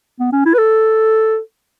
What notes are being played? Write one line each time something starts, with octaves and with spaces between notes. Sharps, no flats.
B3
C#4
E4
B4
A4